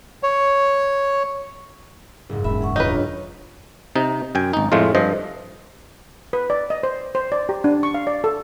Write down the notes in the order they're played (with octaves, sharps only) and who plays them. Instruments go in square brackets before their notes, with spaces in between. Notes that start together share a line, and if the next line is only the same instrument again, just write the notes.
[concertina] C#5
[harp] F#1 G#2
[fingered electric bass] E1 [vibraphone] G#3 B5 [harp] E5
[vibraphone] G#4 F#5 C#6
[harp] D#2 [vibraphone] D4 F4 C#5 [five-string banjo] D#4 B4
[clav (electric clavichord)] C3 D#4
F#2 G5 G#5
G#1 D#4
F2 A2 G#3 A3 F4
G2 F3 C5 D#5
[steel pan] B4
D5
D#5
C5
C5
D5
G4
D4
C#6
F5
D5
A4